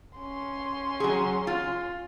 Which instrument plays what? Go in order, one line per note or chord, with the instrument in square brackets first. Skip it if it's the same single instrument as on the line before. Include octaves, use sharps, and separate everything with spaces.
[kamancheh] C#4 C6
[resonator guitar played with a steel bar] F#3 G#4
F4